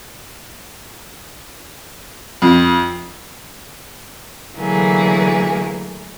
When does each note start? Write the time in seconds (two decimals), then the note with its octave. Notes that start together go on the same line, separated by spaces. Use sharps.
2.42 F2
4.58 D3 E3 F#3 A3 A#3 G#4